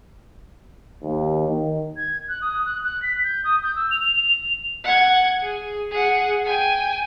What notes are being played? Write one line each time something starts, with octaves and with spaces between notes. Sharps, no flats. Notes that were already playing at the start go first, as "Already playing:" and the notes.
D#2
D#3
G#6
F#6
D#6
F#6
F#6
B6
G6
D#6
G6
E6
F7
F7
F#5 G#6
G#4
G#4 F#5
G5 G#5